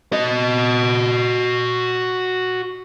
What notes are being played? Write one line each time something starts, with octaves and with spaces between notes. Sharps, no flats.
F#4 D#5